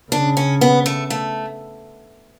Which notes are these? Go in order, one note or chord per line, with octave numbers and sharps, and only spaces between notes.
C#3 D4
C#4
B3
A3
A3